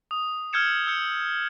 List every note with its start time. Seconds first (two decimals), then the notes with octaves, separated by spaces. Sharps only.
0.11 D#6
0.53 E6 F6 G6 G#6 C#7 E7
0.87 E6 G6 C#7